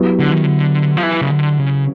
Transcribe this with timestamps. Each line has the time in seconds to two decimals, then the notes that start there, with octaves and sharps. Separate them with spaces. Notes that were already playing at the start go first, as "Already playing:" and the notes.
Already playing: F#3 B3 E4 G4
0.19 D3
0.32 D#3
0.43 D3
0.97 F3
1.03 E3
1.21 C#3
1.30 D3
1.59 C#3